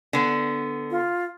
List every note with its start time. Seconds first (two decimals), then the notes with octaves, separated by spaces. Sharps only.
0.13 D3 B3
0.91 F4